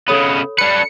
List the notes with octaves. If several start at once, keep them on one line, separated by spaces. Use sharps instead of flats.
C#3 B3 A4 C#5 B5
D4 B4 C#7